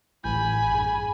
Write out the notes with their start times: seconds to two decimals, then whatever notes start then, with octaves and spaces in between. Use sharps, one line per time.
0.24 A1 A2 G#5 B5 G6
0.72 G2 G#4